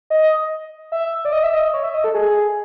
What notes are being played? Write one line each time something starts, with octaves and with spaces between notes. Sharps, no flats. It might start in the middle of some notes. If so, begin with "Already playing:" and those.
D#5
E5
D5
D#5
E5
D#5
D#5
C#5
E5
D#5
A4
G#4